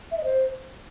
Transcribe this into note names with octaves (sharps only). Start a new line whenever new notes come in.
E5
D#5
C5